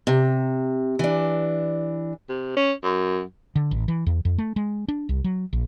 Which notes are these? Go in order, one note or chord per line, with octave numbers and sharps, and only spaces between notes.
C3
E3 D4
C3
C#4
F#2
D3
A1
E3
E2
F2
A3
G#3
D4
C2
F#3
A#1